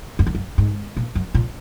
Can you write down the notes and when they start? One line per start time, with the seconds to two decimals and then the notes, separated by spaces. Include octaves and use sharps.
0.19 F#2
0.27 E2
0.35 F#2
0.58 G#2
0.97 A#2
1.15 F#2
1.34 A#2